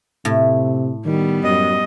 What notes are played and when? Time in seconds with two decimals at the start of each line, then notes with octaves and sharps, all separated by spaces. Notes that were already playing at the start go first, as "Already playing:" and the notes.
0.25 A2 C3
1.06 D#3 G3 B3
1.44 F#2 D#5